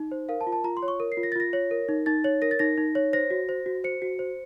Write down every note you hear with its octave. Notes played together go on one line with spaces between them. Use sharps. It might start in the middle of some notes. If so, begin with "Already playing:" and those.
Already playing: D#4
C5
A#4 F5
A5
F4
A5
F4 A#5
C6
C#5
C#6
A#4
C7
F4
A#6
A6
F4 A#6
C#5
A#4
D#4
D#4 A6
C#5
A#4 A#6
A6
D#4 A#6
D#4
C#5
C5 A#6
F#4
C5
F#4
C5 C#7
F#4
C5